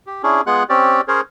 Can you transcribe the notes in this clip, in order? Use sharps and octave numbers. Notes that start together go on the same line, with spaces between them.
G4
C#4 D4 E4 G#4
G#3 B3 F4 G#4 F#5 F#6
C4 C#4 G4 D5
C#4 G#4 A#4 C5 C#5